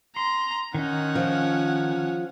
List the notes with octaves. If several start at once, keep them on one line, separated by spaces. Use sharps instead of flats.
A#5 C6
D#3 C#4 D#4 F#5
F3